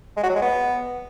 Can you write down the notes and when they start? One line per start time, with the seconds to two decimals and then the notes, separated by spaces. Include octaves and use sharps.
0.17 G#3
0.23 F#4
0.29 F#3
0.36 G#3
0.42 B3